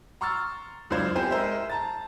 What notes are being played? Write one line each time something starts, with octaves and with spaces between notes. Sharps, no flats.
A#5 C6 C#6 E6 F6 A6
C#2 F#2 D4 F4 C5 G#6
B3 C4 G4 C5 G#5
G#3 A#4 C5 E5
A5 A#5 A6